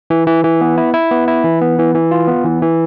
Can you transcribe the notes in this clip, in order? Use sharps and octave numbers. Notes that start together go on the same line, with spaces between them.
E3
E3
E3
B3
E4
E4
B3
E4
E3
B3
E3
E3
F4
B3
E3
E3